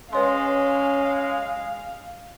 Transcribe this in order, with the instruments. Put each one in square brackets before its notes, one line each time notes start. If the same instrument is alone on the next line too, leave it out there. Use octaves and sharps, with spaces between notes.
[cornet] G#3 [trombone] C#4 [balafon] B4 C#5 C6 [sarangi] F5